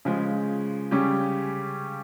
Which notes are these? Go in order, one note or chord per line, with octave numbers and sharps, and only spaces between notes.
C#3 F3 G#3
C#3 G3 C#4 G4